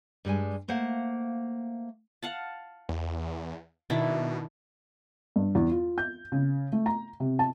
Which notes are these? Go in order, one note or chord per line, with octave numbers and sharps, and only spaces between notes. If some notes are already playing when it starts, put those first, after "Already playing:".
G2 G3 G#3 G#5
A3 A#3 C5 F5 F#5
F5 F#5 A5
E2
B2 D#3 D4 E4
G2
E2
F4
G6
C#3
A3
A#5
C3
A5